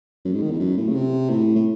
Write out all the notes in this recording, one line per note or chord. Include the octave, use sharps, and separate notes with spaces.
F#2
G#2
D#3
E2
F#2
A2
C#3
C3
A2
A2